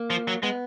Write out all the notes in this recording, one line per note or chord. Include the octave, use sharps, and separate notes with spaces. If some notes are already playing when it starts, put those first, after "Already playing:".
Already playing: A#3
F3
F#3
G#3 B3